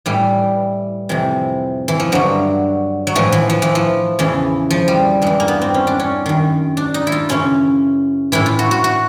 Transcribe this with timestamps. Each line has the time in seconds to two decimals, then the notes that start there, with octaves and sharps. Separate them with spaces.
0.06 A2 E3 G3
1.09 F2 C3 E3
1.88 E3
2.00 F3
2.12 G2 D3 F#3
3.07 F#3
3.15 A2 E3 F3
3.32 E3
3.50 F3
3.62 E3
3.75 F3
4.19 E2 C#3 E3
4.71 F3
4.88 G3
5.22 G2 E3 G#3
5.40 A#3
5.48 B3
5.62 C4
5.74 C#4
5.87 D4
6.00 C#4
6.26 F#2 D#3
6.77 D4
6.94 D#4
7.07 E4
7.12 F4
7.29 F#2 C#3 E3 C#4
8.32 A2 E3 E4
8.46 F4
8.59 F#4
8.71 F#4
8.84 F#4